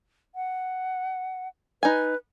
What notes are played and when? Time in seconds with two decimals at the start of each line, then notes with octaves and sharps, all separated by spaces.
0.35 F#5
1.83 D#4 B4 G#5